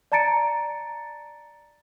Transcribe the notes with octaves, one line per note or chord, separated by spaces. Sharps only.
D5 A5 A#5 A6 C#7 D7